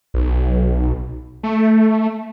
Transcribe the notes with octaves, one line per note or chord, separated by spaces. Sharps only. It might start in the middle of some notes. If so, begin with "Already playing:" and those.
B1
A3